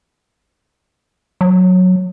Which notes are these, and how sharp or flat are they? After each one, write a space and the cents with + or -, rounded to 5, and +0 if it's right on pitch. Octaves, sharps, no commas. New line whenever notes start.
F#3 -10